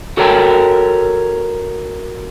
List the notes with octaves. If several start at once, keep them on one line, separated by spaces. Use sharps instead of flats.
F#4 A4 A#4 C#5 G5 A5